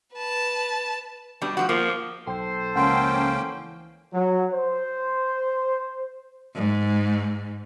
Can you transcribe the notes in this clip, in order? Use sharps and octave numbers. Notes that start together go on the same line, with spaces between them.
B4 A5
B2 G3 D4
G#2 F3 F#4
F3 A#3
B1 A4 C5 G5
C#2 F3 G#3 A#3 C#4 F#5 G5 C6
E3
F#3
C5
G#2